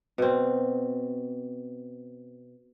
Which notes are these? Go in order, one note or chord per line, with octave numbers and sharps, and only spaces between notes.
B2 C4